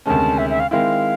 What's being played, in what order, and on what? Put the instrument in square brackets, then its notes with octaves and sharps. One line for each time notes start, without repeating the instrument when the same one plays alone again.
[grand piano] D2 C3 D#3 G#3 C#4 [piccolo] A5
[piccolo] E5
E5
F5
[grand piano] D#3 G#3 C4 E4 [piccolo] F5